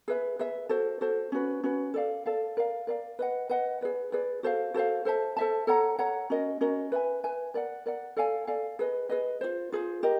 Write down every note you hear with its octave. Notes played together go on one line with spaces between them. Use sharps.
G#4 B4 E5
G#4 B4 E5
F#4 A4 C5
F#4 A4 C5
C#4 F#4 B4
C#4 F#4 B4
A4 D5 F5
A4 D5 F5
A#4 D5 F5
A#4 D5 F5
B4 D#5 F#5
B4 D#5 F#5
G#4 B4 D5
G#4 B4 D5
F#4 A4 C5 F5
F#4 A4 C5 F5
A4 C5 E5 A5
A4 C5 E5 A5
A4 C#5 F#5 A#5
A4 C#5 F#5 A#5
C#4 F#4 A#4 D#5
C#4 F#4 A#4 D#5
B4 E5 G#5
B4 E5 G#5
A#4 D5 F#5
A#4 D5 F#5
A4 D5 F5 G#5
A4 D5 F5 G#5
G#4 B4 D#5
G#4 B4 D#5
F4 G#4 C5
F4 G#4 C5
G4 A#4 D#5